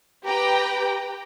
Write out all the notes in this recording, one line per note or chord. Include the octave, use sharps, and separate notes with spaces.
G4 B4 G5 A#5